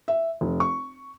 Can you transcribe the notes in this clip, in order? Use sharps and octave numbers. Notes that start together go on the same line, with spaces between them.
E5
F1
C#6